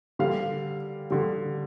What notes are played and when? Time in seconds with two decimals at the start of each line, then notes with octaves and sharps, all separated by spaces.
0.19 D3 G3 F5
1.11 D3 G3